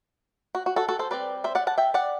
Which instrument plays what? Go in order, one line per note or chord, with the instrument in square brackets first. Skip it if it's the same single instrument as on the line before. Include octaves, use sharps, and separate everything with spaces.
[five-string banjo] F#4
F#4
F#4 A4
F#4 A4
A4 C5
G3 C4 B4 D5
C5 E5
D5 F#5
F#5 A5
E5 G5
D5 F#5